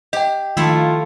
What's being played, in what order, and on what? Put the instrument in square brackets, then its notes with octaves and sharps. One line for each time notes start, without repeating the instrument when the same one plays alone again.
[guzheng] G4 [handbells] D#5 G5
[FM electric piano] D#3 [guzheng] F3 A3 E4 [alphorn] F4